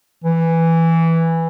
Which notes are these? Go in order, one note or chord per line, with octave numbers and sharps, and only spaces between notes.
E3